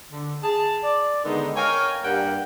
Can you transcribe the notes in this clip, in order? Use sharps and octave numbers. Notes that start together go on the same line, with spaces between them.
D3
G#4 A5
D5
D3 D#3 G#3 B3 D#4
A#4 C#5 F5 G5 G#5
G2 A#3 D4 G4 F#5 G5